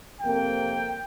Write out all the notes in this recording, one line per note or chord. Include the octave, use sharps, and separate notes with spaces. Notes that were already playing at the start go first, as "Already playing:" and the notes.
F2 C3 A#3 G5